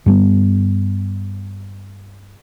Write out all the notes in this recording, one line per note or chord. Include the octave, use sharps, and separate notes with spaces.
G2 G3 B3